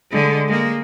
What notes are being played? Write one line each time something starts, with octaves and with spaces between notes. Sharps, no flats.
D3 G#3
G#3 A#3